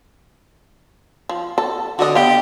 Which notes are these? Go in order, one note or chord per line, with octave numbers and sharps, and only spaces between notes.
F3
A4
D3 F#4 D#5
B3 G4 F5